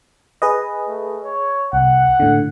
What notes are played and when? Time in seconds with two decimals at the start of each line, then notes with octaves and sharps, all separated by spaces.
0.42 G#4 B4 D#5
0.88 A3
1.23 C#5
1.73 C2 F#5
2.20 A2 D3